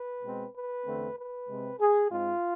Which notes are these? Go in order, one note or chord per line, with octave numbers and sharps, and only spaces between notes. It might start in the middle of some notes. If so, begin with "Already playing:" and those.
Already playing: B4
B2 G#3 C4
B4
E2 D3 A3 C4
B4
C3 G#3 C4
G#4
G#2 G#3 C4 F4